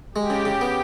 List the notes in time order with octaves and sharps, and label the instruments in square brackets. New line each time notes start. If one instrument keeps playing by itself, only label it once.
[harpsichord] G#3 [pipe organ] G4
[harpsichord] C#3
C#3
B3